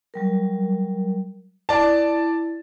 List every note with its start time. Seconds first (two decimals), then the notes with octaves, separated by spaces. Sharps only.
0.14 F#3 G3 A#4
1.69 E4 D5 A5